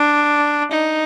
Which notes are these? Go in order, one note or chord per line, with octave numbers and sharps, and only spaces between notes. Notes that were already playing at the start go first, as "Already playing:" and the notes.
Already playing: D4
D#4